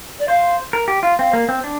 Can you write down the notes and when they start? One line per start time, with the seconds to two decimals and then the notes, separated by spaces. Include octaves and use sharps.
0.19 D5
0.28 C5 F5
0.73 A#4
0.88 G4
1.03 F4
1.19 C4 F5
1.33 A#3
1.49 C4
1.64 D4